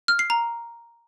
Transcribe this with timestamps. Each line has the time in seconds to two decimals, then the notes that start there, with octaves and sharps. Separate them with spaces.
0.08 F6
0.19 C7
0.30 A#5